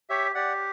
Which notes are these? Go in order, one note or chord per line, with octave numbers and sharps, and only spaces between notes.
G4 C#5 E5
G4 D5 F#5